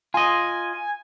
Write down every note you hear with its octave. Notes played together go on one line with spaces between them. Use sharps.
F4 D#5 G#5